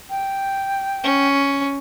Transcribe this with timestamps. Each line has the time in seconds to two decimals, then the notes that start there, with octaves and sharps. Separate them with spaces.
0.10 G5
1.03 C#4